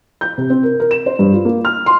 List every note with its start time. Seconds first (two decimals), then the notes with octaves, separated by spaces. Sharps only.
0.21 G6
0.38 C3
0.50 C4
0.63 A#4
0.80 A#4
0.91 E7
1.06 C5
1.19 G2
1.33 F4
1.45 A#3
1.65 F6
1.86 C6